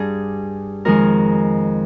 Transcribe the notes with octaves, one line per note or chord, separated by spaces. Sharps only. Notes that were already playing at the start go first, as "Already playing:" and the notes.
Already playing: G2 G3 G#4
F2 D#3 G#3 A#4